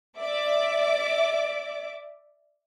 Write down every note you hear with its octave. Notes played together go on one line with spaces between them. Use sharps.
D5 E5 D6